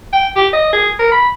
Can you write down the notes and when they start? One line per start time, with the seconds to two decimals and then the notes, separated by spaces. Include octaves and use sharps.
0.13 G5
0.36 G4
0.53 D#5
0.73 G#4
0.99 A#4
1.12 B5